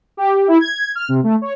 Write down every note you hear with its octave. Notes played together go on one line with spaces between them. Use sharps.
G4
E4
G#6
F6
C3
A3
C#5